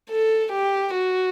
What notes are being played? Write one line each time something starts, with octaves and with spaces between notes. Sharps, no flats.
A4
G4
F#4